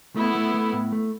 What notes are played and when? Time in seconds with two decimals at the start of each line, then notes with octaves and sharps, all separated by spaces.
0.16 A3 B3 E4
0.35 A3
0.54 A3
0.73 A2
0.92 A3